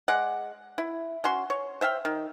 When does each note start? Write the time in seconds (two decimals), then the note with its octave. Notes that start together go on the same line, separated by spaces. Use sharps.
0.08 G#3 D5 F#5
0.78 E4
1.24 C#4 F#4 C6
1.50 C#5
1.81 C5 E5 F5 G5
2.05 D#3